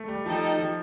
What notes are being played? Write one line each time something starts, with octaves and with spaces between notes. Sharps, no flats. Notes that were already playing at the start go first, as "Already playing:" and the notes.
Already playing: A3
G3
F3 D#4 A4 D#5 G5
F3